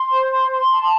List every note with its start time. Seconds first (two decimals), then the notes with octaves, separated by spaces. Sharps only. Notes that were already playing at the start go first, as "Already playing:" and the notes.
Already playing: C6
0.11 C5
0.31 C6
0.51 C6
0.70 A5